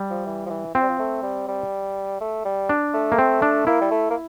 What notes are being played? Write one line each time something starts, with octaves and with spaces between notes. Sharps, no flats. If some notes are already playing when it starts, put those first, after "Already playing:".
Already playing: G3
F3
E3
F3
E3
F3 C4
G3
F3
A3
G3
G3
A3
G3
D4
A3
A#3
C4
D4
A#3 E4
G3
A3
A#3